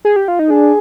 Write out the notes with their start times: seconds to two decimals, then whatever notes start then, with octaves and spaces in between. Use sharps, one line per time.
0.05 G#4
0.16 G4
0.28 F4
0.39 D#4
0.50 D4 G#4